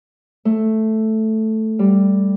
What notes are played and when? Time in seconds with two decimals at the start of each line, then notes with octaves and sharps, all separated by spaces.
0.45 A3
1.79 G3